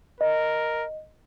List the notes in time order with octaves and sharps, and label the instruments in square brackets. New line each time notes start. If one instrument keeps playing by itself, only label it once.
[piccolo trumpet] A#4 [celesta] D#5